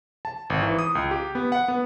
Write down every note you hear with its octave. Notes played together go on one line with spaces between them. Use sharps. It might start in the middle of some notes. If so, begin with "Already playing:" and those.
A5
G#1
E3
D#6
C#2
G4
B3
F#5
B3